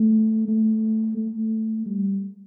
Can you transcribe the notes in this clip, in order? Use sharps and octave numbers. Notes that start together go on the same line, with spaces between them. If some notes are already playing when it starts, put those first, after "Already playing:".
Already playing: A3
A3
A3
G3